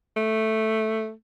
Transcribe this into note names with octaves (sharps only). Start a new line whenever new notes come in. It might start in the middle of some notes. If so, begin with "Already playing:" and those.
A3